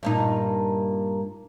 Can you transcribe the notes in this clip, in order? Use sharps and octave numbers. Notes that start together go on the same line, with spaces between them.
G2 A#2 D#4